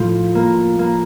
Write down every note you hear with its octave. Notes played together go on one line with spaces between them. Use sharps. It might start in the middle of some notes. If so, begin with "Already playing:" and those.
Already playing: A2 F3
A#3
A#3